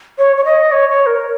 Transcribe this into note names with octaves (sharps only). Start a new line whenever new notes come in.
C#5
C#5
D#5
C#5
C#5
A#4